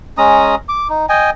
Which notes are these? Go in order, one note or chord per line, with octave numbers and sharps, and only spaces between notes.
G#3 C#4 A#5 D#6
D6
D#4
D#5 G5 G#5